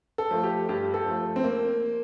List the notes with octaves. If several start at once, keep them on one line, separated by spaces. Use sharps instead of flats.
A4
F3 A3
G4
G2 G4
A4
F3 A3
C4
A#3